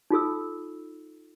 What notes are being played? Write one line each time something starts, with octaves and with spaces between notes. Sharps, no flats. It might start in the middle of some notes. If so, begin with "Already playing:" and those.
D#4 F4 A4 E6